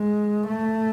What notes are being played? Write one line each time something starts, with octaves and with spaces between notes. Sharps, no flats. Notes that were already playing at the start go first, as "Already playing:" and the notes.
Already playing: G#3
A3